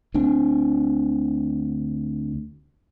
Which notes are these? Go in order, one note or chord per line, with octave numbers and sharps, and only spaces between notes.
D2 D3 C4 D4